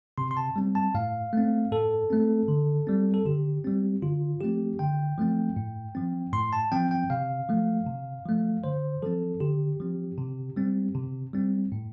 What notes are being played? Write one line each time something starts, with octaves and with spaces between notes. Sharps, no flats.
C3 C6
C6
A5
G3 C4
A5
A2 F5
A3 C4
A2 A4
A3 C4
D3
G3 C4
A4
D3 G4
G3 C4
D3 F4
F3 A3 C4 G4
D3 G5
F3 A3 C4
A2
F3 C4
A2 C6
A5
F3 C4 G5
G5
C3 F5
F3 A3
C3
F3 A3
D3 C5
F3 C4 A4
D3 G4
F3 C4
C3
G3 C4
C3
G3 C4
A2